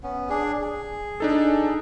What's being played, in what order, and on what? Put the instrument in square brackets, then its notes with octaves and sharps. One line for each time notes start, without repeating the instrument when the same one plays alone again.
[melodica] B3 C#4
D4 G#4
G#4
[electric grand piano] D4 D#4 A4